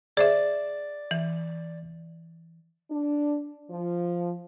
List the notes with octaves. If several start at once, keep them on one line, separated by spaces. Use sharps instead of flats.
G#4 C5 D5 E5
E3
D4
F3